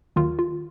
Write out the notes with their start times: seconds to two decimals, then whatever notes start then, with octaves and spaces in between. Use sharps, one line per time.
0.16 D#2 D#3 F#3 F4
0.39 F4